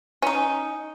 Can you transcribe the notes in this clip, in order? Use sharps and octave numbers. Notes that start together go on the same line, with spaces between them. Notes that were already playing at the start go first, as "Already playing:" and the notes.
C#4 D#4